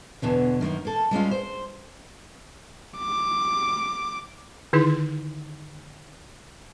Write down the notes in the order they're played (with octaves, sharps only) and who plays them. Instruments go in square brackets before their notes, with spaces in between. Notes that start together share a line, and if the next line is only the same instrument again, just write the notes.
[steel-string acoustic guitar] E2 B2 D3 E3
F#2 D#3 A#3 D#4
A#3 A4
G3 G#3 C#4 F4
C5
[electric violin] D6
[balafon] D3 D#3 D#4 E4 G#4